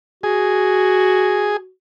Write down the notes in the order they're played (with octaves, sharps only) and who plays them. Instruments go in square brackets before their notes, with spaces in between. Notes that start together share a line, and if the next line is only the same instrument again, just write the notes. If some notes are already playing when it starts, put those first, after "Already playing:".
[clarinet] F#4 [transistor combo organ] G#4